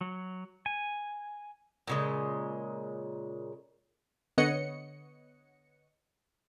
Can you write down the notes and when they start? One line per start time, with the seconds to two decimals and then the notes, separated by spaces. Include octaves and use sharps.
0.01 F#3
0.66 G#5
1.87 A#2 C#3 G#3
4.38 D3 B3 C#5 D#5 F#5 C#7